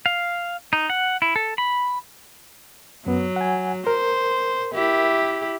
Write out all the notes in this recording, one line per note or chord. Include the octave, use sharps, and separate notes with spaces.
F5
D#4
F#5
E4
A4
B5
F#2 F#3 B3
F#5 G#5
A#4 C5
E4 G4